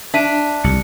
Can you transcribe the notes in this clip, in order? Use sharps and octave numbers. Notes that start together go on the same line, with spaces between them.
D4 E5 B6 D#7
C2 C#7